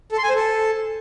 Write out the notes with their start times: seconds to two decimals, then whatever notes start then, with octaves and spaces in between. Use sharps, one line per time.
0.12 A4
0.18 C6
0.24 G#5
0.29 C5
0.35 A4